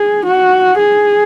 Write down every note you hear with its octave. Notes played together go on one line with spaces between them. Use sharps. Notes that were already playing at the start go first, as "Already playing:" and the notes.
Already playing: G#4
F#4
G#4